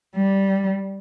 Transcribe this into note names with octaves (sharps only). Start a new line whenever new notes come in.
G3